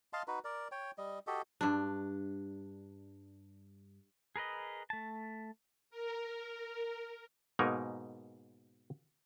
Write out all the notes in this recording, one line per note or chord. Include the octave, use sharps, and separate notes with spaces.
D#5 F5 A5 C6
D#4 F#4 B4
A#4 D5
C#5 G5
G3 D#5
F#4 G4 A4 D#5
G2 D4
G#4 A#4 B4 D#5
A3 A5
A#4
G#2 B2 A#3 D#4 A#4 G#5